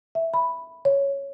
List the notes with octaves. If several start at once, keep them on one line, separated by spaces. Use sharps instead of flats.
E5
B5
C#5